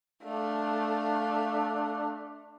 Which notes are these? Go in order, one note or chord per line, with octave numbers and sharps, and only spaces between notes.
A3 D4 F5